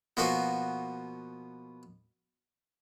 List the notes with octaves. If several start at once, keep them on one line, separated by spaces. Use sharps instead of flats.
B2 F3 A#3 B3 F#4